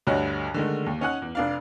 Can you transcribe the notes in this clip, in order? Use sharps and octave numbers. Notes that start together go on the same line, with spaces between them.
D2 G2 D3 C#5 D#5 F#6
D3 D#3 G#3 A3 A#4
D#2
C#4 D#4 F#5 G#5 F#6
E2
F1 D4 F5